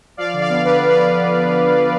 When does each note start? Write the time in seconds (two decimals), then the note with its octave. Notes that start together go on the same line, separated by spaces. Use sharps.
0.17 F3 D5 F5
0.34 D3
0.41 D5 F5
0.50 B3
0.65 D3 B4 D5
0.81 D3
0.89 D5 F5
0.97 D3
1.12 D3
1.28 D3
1.45 B3
1.60 D3
1.76 D3